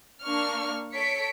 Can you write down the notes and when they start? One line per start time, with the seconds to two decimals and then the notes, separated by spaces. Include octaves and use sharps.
0.22 A#3 D4 C#6 F6
0.93 A4 C#5 B6 C#7 D7